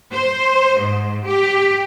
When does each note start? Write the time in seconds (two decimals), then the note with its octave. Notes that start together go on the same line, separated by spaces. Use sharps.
0.12 C5
0.79 G#2
1.25 G4